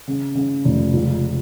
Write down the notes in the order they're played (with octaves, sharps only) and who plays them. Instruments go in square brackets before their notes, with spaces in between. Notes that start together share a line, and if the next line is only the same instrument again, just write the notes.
[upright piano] C#3
C#3
F1
C#2